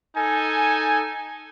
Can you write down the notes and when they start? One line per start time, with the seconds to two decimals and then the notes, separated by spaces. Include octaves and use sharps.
0.16 D#4 A4 G#5